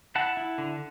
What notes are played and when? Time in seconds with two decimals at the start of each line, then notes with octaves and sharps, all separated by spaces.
0.15 E4 F#5 A5
0.37 E4
0.58 D3